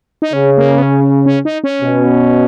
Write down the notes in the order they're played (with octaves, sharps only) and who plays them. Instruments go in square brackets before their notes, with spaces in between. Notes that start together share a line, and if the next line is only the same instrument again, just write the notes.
[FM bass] D#4
[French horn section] C#3 [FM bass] C#4
[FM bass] A#3
B3
C#4
C#4
D#4
C#4
[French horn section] B2